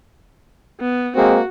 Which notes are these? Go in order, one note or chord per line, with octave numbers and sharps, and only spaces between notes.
B3
G#3 A#3 C4 F#4